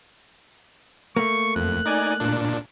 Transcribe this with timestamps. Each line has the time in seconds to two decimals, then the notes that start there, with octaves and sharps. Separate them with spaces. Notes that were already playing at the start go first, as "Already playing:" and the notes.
1.17 A3 A#3 C#6
1.56 F2 F#6
1.85 D#4 D5 G#5
2.20 A#2 D4